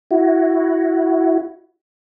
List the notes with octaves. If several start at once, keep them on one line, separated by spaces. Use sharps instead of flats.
E4 F#4